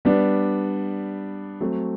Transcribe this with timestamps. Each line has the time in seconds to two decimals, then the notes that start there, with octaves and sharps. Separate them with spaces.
0.05 G3 B3 D4
1.61 F#3 A3 C4